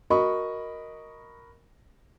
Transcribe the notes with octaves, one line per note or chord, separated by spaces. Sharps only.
F#4 A#4 D#5 B5 C#6